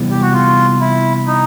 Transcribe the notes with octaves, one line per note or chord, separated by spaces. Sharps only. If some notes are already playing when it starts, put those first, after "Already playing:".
Already playing: C3 E3 G3 B3
G4
F#4
F4
E4
D#4